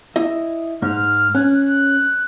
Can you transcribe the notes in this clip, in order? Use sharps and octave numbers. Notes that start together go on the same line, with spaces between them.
E4 D#5
G#2 F6
C#4 F#6